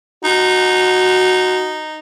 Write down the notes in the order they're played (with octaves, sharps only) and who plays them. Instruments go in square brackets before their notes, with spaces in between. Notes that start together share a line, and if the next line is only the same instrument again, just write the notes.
[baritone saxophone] D#4 [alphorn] F#4